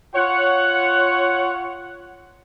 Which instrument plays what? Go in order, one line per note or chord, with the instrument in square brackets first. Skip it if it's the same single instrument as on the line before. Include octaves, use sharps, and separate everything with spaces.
[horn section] F4 C#5 F#5